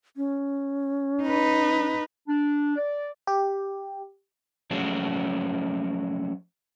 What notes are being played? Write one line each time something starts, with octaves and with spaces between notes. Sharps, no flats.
C#4
D#4 B4
D4
D5
G4
F3 F#3 A3 C#4 F#4 G#4